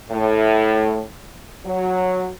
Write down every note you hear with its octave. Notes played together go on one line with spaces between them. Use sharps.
A2
F#3